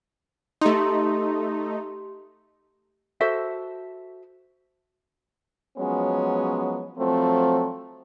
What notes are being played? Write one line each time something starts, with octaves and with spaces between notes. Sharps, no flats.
A3 D#4 G4 C6
F#4 A4 C5 E5
F3 F#3 G#3 B3 C#4
F3 F#3 A3 C4